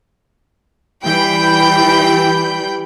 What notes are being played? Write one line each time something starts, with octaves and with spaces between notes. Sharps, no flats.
E3 G3 G5 B5 G6